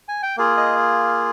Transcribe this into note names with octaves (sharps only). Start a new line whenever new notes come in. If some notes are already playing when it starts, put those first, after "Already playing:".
G#5
G5
A#3 F4 G#4
D#5